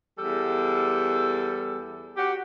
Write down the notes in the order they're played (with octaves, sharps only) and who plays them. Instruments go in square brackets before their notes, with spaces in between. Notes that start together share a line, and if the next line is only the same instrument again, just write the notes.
[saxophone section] E2 G3 A4
F#4 G4